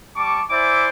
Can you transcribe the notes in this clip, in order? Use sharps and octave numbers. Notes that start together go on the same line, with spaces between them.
G3 A5 C#6 D6
E4 C5 D5 E5 G#5 D6